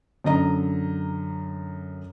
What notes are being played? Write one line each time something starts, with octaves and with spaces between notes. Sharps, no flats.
F#2 D3 D#5 A#5